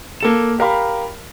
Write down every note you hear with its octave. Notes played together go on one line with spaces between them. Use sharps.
A#3 A4 E7
G4 A#4 F5 B5